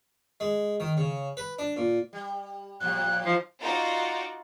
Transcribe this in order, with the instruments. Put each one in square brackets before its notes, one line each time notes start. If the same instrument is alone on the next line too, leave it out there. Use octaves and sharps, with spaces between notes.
[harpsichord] G#3
D#3
C#3
B4
D4
A#2
[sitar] G3
[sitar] A2 F3 G3 [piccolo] F#6
[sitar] E3 D#4 [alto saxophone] F3 [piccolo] C7
[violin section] D#4 F4 F#4 D5